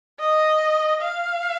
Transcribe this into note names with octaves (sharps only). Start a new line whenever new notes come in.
D#5
F5